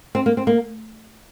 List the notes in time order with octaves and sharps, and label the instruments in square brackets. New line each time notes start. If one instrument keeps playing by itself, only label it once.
[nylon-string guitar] C4
A#3
C4
A#3